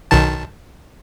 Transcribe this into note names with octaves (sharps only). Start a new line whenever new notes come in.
B1 D#3 A5